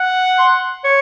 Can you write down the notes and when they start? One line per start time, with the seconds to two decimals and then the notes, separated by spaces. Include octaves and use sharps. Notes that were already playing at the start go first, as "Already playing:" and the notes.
Already playing: F#5
0.38 C6
0.84 C#5